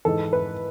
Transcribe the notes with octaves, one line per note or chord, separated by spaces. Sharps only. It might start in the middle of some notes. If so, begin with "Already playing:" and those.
G#2 E3 A4
B4